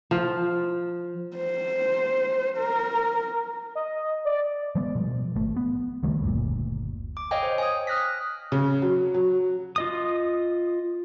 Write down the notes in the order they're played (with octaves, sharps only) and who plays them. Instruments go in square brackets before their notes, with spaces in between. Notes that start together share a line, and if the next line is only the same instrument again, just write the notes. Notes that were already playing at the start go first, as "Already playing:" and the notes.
[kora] F3
[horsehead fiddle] C5
A#4
[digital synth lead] D#5
D5
[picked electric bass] F3 G3 G#3 B3
B2 F3
G#1 A3
B3
C#2 D#3 G3 A3
F#1 D2 A#2
[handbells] D6
C#5 D#5 F5 G5 G#5
C5
G#5 D#6
D#6 F6 F#6 A#6 B6
[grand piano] C#3
F#3
F#3
[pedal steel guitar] F4 D#5 D#6